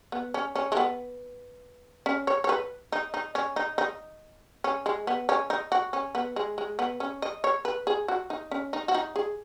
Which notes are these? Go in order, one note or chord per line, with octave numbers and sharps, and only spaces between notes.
B3
C#4
C#4
G#3
B3
C#4
C#5
C#5
B4
D#4
D#4
C#4
D#4
D#4
C#4
G#3
B3
C#4
D#4
F#4
C#4
B3
G#3
G#3
B3
C#4
D#5
C#5
B4
G#4
F#4
D#4
C#4
D#4
F#4
D#4
G#4